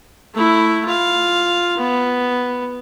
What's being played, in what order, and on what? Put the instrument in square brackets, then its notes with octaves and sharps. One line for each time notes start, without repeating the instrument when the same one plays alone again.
[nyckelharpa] A3 E4
F4 F5
B3